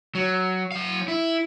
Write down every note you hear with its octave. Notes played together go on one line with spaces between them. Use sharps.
F#3
F#3 F5
E4